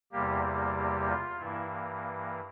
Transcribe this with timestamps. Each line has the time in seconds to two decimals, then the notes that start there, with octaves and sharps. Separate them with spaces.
0.12 E2 C3 G3 A#3 G4
0.44 G4
0.76 G4
1.08 F4
1.39 G2 E3 A#3 E4